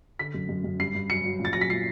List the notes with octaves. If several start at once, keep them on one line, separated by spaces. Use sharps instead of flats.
D3 B6
F#2
F#2
F#2
G2 C7
G2
F#3 C#7
F#3
A#2
A6
F#3 A#6
B6
A#2 C7